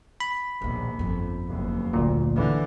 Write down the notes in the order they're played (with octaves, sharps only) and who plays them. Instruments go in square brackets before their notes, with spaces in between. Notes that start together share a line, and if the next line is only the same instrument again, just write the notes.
[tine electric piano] B5
[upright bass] A#1 B2 [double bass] D#2
[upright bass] G1 F2
[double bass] F#1 D#2
[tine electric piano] D2 A#2
[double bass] D3 E3